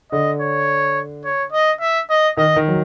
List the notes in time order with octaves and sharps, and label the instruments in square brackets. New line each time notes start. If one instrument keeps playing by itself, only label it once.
[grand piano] D3 [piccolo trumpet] D#5
[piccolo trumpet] C#5
C#5
D#5
E5
D#5
[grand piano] D#3 [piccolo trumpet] D#5
[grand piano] D#3
F#3